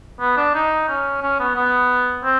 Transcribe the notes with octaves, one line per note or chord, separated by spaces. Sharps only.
B3
D4
D#4
C#4
C#4
B3
B3
C4